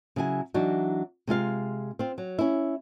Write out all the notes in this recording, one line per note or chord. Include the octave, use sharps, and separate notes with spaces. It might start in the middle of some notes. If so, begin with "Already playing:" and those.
C#3 F#3 E4 G#5
E3 F#3 D4 D#4 F#4
C3 G#3 F4 F5
C4 F4
F#3
C#4 E4